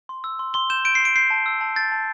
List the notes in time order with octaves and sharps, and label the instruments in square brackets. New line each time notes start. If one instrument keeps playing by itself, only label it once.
[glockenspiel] C6
E6
C6
C6 G7
G6 E7
G6 D7
C7
C6 D7
G6 C7
A5
E6
A5
G6 A6
A5